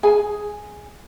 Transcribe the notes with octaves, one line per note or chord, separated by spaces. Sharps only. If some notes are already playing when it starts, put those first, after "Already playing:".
G#4 G#5